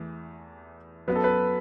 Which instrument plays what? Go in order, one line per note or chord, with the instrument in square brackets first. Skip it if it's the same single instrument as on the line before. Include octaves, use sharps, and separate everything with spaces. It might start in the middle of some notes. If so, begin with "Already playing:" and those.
Already playing: [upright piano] E2 E3 A3
[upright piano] F#2 F#3 B3 [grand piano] B4
[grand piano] A4
B4